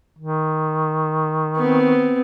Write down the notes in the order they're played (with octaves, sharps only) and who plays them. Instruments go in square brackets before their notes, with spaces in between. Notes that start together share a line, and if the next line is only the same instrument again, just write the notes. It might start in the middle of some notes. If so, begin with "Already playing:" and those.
[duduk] D#3
[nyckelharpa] B3 C4